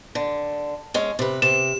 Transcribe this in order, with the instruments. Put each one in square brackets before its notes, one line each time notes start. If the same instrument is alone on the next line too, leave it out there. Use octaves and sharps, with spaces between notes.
[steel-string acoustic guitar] D3
G#3 C#4
C3 B4
[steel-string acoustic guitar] C3 [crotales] E7